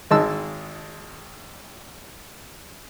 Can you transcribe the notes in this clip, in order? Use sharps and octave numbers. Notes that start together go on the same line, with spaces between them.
G#1 G#3 A5 E6